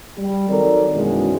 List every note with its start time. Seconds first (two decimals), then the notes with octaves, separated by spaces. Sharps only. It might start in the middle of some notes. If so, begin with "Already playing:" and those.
0.18 G3
0.49 D#3 F#3 C4 A4 A#4 D5
0.95 F#2 B2 D#3 E3 G#3